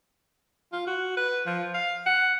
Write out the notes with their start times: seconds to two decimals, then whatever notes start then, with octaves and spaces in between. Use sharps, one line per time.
0.72 F4
0.87 F#4
1.17 B4
1.47 F3
1.74 F5
2.06 F#5